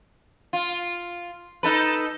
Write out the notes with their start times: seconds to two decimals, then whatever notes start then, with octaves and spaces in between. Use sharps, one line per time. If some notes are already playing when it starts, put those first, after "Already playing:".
0.53 F4
1.63 D#4 A4 B4